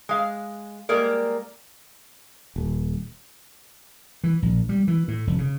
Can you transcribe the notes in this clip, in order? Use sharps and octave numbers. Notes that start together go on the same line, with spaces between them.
G#3 F5
G3 G#3 A#3 A#4 D5
D#1
E3
A#1
G3
E3
A2
F1
C#3